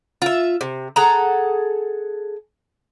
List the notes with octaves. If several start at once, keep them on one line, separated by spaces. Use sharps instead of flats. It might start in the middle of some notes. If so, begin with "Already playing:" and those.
F4 E5
C3
G#4 A4 F#5 A#5